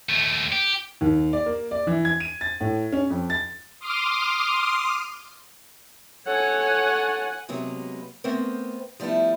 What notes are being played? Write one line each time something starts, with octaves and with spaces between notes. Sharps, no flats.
D#2 A3
G4
D#2
D5
A#3
D5
E3
G#6
D#7
A6
A2
C#4
F2
A6
C6 D6 D#6 F6
A4 C#5 F#5 G#5
C3 F#3 G#3 A#3 B3
A3 B3 C4 A#4 C5
F3 G3 A3 B3 E4